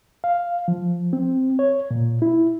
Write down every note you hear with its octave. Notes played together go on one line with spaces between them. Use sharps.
F5
F3
C4
C#5
A#2
E4